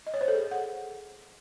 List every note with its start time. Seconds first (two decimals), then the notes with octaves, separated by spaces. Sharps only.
0.07 D#5
0.14 C#5
0.21 C5
0.28 A4
0.35 G#4
0.51 F#5